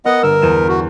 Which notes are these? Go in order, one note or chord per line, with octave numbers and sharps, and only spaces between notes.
B3 A#4 D#5 F#5
G1 A#4 E6 E7
E2 D#7 E7
F#4